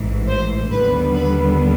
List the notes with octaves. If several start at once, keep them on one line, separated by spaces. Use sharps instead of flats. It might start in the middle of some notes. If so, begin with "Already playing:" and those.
Already playing: A1 G#2 E3
C5
D#2 D3 G3 B3 B4
B4